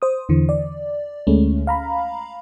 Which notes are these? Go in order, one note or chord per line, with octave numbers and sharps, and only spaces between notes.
C5 D#6
E2 D3 E3
D5
D2 G#3 A3 C#4
F5 A#5 B5